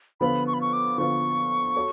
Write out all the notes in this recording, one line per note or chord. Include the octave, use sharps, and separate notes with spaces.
D3 F3 B3 F4 B4 B5
C#6
B5
C#6
D6
D3 F3 B3 F4 B4 C#6
F#4 A4 C#5